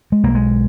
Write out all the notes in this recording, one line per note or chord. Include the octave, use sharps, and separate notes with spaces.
G#3
B1 A#3
G#3